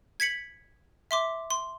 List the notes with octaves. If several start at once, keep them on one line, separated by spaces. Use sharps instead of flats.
G#6 B6 C#7 F#7
E5 C6 D6
C6